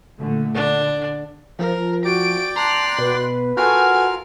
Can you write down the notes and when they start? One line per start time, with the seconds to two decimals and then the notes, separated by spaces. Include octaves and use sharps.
0.19 A#2 D3 A3
0.55 D3 D4
1.59 F3 A#4
2.05 F#4 D5 G5 D6 D7
2.56 A5 A#5 C6 F#6
2.99 B2 B4
3.57 F4 F#4 A4 A#4 G#5 F6